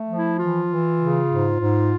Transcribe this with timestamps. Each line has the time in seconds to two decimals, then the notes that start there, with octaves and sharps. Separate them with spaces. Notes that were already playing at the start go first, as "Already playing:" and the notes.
Already playing: A3
0.08 F3
0.16 E4
0.39 E3 F4
0.69 E3
0.99 C#3
1.30 G#2
1.60 G#2